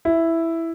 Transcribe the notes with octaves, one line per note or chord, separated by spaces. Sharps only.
E4